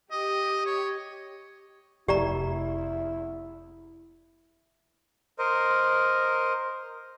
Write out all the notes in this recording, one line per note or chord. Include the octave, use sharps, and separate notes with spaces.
G4 D#5
C#5
F1 E4 G4 D5 A#5
A#4 C5 D#5